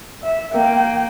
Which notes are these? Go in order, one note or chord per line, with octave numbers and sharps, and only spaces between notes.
E5
A#3 G5